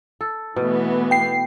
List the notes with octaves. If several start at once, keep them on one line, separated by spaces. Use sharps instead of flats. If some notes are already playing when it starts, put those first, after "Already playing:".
A4
B2 E3 A3 B3
G5 C7